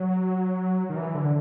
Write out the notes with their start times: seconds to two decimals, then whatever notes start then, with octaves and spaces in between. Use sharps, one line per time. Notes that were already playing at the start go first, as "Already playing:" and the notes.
Already playing: F#3
0.90 D#3
0.96 E3
1.15 D3